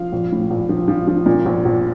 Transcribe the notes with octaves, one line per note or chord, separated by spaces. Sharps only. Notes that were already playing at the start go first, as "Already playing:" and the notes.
Already playing: F3 F5
A#1
A2
A#1
F3
F3
F3
A#2
A#1
A#1